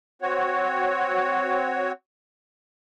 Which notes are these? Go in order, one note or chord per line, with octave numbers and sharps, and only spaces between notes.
C4 F#4 C#5